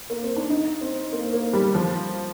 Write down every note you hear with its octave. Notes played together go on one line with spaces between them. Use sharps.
A#3
C4
D4
D#4
C4
A#3
A#3
G3
F3